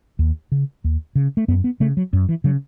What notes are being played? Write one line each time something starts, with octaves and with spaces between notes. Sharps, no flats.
D#2
C#3
D#2
C#3
A3
F#2 B3
B3
C#3 A3
F#3
F#2
E3
C#3 F#3